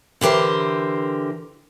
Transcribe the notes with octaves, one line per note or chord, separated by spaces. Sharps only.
D3 E3 G4 A#4 C5